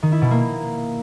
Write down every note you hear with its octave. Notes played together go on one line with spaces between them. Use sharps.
D#3
E4
B2
A#3